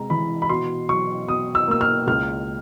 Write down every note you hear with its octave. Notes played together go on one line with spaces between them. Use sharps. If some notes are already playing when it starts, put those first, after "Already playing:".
Already playing: C3 G#3 A#5
E3 B5
B5
B2 C6
F#3 C#6
B2 D#6
E6
A#3 E6
F6
C#2 F6